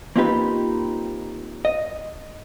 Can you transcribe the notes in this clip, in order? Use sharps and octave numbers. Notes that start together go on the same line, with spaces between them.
A#3 C4 D#4 F4 G4 B4
D#5